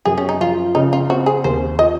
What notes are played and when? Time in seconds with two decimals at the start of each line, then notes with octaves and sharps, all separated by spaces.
0.05 F#2 G#4
0.18 C#4
0.29 D#4
0.41 F3 F4
0.75 C#3 D#4
0.93 F4
1.10 C4 F#4
1.26 G#4
1.44 D#2 C5
1.79 F4 D#5